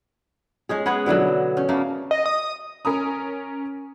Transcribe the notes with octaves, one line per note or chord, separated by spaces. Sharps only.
G#3 C#4 G#4
B3 G#4 C#5 F#5
B2 D3 E3 F#3
C#4
C#3 A3 A#3
D#5
D#6
C#4 A#4 A#5 D#6